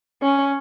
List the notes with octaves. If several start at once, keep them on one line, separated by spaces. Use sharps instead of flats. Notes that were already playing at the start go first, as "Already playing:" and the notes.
C#4